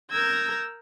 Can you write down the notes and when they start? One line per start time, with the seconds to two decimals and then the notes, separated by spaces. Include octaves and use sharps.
0.11 A#4 A#5 E6 G6 G#6 A#6